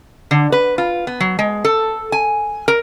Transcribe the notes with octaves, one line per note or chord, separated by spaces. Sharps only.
D3
B4
F4
B3
F#3
G#3
A4
G#5
A#4